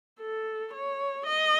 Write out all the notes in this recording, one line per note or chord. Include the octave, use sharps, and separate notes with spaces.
A4
C#5
D#5